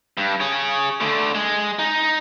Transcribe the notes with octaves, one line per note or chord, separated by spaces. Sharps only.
G2
G#4 C#5
D3 A3
G#3
D#4